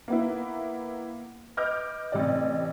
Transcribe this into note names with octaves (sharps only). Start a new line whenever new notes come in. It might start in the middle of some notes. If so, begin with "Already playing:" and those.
A#3 B3 E4
B4 D#5 D6 F6 G6
A1 C3 D5